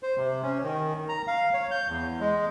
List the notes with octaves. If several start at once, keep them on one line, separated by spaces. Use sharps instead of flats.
C5
C3
C#4
D#3
A#5
F5
C#5
G6
E2
G#3